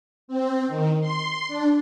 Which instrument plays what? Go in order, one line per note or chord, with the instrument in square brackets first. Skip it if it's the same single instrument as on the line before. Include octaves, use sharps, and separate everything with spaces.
[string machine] C4
D#3
C6
D4